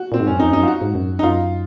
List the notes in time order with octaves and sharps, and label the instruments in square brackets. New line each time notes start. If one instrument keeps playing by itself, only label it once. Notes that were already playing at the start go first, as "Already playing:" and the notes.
Already playing: [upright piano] F#4
[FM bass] A#2 [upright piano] C4
[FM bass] G#2
[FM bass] F#2 [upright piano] C#4
[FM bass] F2 [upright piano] D#4
[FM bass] F#2 [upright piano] D#4
[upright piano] F4
F#4
[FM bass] G#2
F#2
[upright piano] D#4
[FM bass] F#2 [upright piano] F4